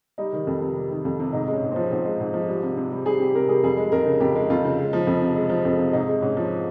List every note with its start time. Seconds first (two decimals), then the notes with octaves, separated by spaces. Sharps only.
0.18 G3 D#4
0.33 D#3
0.47 F2
0.61 C3
0.76 G3
0.91 D#3
1.05 F2
1.20 C3
1.33 G#2 D#4
1.48 G#3
1.53 C#4
1.62 G#2
1.72 F3 C4
1.91 G#2 C4
2.05 G#3
2.20 G#2
2.34 F3
2.48 G3
2.63 C3
2.77 C3
2.92 G3
3.05 G3 G#4
3.20 C3 G4
3.34 C3 A#4
3.48 G3 G#4
3.63 F2 G#4
3.77 G#3
3.92 F2 A#4
4.06 C#3
4.20 F2 G4
4.36 G#3
4.50 F2 F4
4.64 C#3
4.79 G#3
4.93 F3
5.07 F2
5.22 C3
5.36 G#3
5.50 F3
5.65 F2
5.79 C3
5.93 G#2 D#4
6.08 G#3
6.22 G#2 C#4
6.37 F3